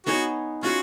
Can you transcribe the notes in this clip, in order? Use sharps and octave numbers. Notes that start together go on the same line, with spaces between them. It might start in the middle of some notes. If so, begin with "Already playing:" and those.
B3 D#4 F#4 G#4 C#5
C#4 F4 F#4 G#4